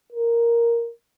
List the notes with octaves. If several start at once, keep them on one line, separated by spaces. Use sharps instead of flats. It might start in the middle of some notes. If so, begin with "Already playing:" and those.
A#4